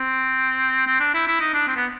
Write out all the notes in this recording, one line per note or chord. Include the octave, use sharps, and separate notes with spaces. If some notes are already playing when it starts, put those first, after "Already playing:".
Already playing: C4
C4
D4
E4
E4
D#4
D4
C4
B3